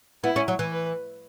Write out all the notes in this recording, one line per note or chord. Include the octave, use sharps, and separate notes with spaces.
B3 E4
C#4
F#3
E3
B4